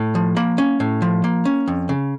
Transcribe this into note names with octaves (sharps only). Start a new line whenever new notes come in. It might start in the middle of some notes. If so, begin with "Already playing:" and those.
Already playing: A2
F3
A#3 B5
C#4
A2
F3
A#3
C#4
F2
C#3